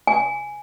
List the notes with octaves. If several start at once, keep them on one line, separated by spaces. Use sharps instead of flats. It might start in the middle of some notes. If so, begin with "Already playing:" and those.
G#5